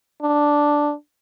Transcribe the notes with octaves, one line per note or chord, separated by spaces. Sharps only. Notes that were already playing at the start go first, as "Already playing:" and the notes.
D4